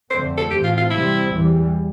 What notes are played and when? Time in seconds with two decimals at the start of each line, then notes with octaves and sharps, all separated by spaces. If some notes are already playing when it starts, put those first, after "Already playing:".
0.10 F2 D3 A3 C4 C5
0.37 A4
0.50 A2 E3 A3 C4 G4
0.64 F4
0.78 F4
0.91 C3 G3 C4 E4
1.31 E2 E3 G3